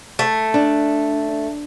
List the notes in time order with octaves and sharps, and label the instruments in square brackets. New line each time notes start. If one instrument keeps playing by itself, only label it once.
[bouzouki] A3
[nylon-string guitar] D4